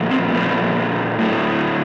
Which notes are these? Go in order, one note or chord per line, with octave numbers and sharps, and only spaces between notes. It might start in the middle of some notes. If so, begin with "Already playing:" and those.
Already playing: A#2 F3 A3
C4
A#2 F3 A3 B3
A2 F#3 A3